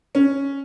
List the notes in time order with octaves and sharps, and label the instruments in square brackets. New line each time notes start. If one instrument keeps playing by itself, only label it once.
[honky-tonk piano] C#4